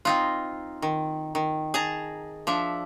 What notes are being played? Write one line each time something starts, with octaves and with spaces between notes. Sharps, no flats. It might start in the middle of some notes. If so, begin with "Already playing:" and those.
C4 D#4 F4
D#3
D#3
G#4 A5 A#5
F3 D4 E5